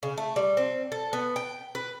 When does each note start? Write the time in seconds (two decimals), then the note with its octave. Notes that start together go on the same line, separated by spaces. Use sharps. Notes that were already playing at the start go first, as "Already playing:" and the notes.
0.03 C#3
0.18 A3
0.36 G3
0.57 C4
0.92 A4
1.13 B3
1.36 G5
1.75 B4